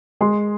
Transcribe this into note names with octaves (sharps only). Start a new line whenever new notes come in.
G#3 C6